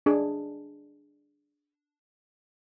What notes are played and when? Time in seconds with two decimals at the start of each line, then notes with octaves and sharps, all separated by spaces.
0.06 D4 G#4